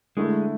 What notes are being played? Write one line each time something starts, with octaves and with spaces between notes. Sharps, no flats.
D3 G#3 A3 E4